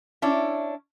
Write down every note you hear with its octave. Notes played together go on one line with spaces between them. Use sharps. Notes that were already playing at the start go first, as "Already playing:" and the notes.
C#4 D4 E4